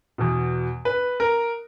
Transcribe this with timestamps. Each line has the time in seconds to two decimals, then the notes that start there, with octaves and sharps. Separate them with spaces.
0.18 E2 B2
0.85 B4
1.20 A#4